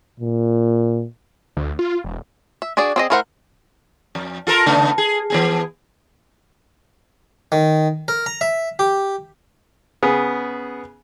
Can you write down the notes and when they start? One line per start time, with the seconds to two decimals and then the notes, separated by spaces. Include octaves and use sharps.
0.20 A#2
1.57 D2
1.79 F4
2.04 E1
2.62 E5
2.77 D4 F#4 G#4 D5
2.96 C4 G#4 D#5
3.10 A3 E4 A#4 C5 F#5
4.15 F2
4.47 F4 A4 A#4
4.66 C#3 A3 B3
4.98 G#4
5.30 E3 B3 G#4
7.52 D#3
8.08 A#4
8.26 A#5
8.41 E5
8.79 G4
10.02 C#3 B3 G#4